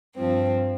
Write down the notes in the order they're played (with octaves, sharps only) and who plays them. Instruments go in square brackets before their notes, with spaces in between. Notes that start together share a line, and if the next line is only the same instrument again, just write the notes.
[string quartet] G2 F3 C4